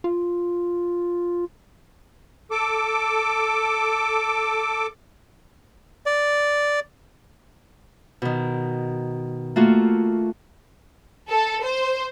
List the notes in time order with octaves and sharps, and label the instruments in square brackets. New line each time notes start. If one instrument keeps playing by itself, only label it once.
[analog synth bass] F4
[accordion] A4 D6
[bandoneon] D5
[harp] B2 D#3
A3 A#3 F4 F#4
[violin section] A4
C5